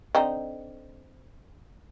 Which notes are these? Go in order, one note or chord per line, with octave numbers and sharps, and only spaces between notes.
D3 C4 D#4